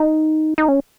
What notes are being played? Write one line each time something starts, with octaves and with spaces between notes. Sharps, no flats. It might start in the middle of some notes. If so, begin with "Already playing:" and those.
Already playing: D#4
D#4
C#4